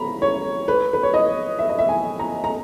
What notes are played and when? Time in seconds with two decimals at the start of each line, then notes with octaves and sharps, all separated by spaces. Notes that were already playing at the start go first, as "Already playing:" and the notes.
Already playing: A#5 B5
0.22 C#5
0.68 B4
0.93 B4
1.03 C#5
1.14 D#5
1.59 E5
1.69 D#5
1.79 E5
1.89 G#5
2.19 A#5
2.44 A#5